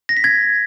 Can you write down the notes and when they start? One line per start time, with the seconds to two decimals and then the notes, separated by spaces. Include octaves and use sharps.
0.09 A#6
0.17 B6
0.24 G#6